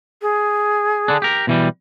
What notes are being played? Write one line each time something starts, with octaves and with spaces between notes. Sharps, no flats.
G#4
D3 D4
G4 A#4
B2 E3 G3